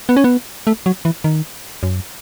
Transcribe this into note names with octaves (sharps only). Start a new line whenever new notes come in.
B3
C#4
B3
A3
F#3
E3
D#3
F#2